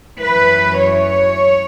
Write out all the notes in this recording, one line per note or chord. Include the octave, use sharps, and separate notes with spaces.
F#2 E3 B4
C#5